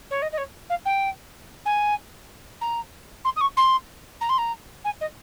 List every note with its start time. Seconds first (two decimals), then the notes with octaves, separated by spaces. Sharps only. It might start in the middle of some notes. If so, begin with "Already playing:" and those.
0.10 C#5
0.22 D#5
0.32 D#5
0.37 C#5
0.69 F5
0.85 G5
1.65 G#5
2.61 A#5
3.24 C6
3.36 D#6
3.40 C#6
3.57 C6
4.20 A#5
4.29 C6
4.38 A#5
4.84 G#5
5.00 D#5